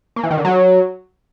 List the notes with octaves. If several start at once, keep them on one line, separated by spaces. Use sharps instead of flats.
A#3
E3
D#3
D3
F#3